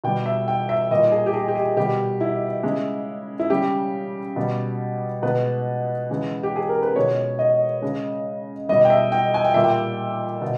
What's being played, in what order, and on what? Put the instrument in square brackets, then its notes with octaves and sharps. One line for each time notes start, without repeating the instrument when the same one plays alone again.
[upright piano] B2 G3 G5
E5
G5
E5
A#2 G3 D#5
G#4
G4
G#4
G4
G#4
B2 G3 G4
E4
C#3 G#3
E4
C#3 G3 G4
B2 G3
B2 G#3 B4
C#3 E3 G#3
G4
G#4
A#4
B4
B2 G#3 C#5
D#5
C#3 G#3
B2 G3 D#5
G5
E5
G5
G#5
G5
A#2 G3 E5
G5
B2